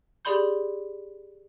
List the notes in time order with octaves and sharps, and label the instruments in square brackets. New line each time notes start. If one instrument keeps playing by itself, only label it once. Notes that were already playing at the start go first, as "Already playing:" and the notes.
[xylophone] G4 G#4 D5 B5 C6 G6